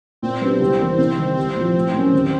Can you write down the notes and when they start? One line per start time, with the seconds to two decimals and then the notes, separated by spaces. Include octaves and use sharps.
0.22 A#2 C4
0.41 F#3 B3 D4 G4
0.60 C2
0.79 C3 E3 G3 A#3
0.98 C3 C4
1.18 D#3 G3
1.37 C2 C4
1.56 A#2 F3
1.75 A2
1.94 F#3 A#3 C#4
2.13 D#2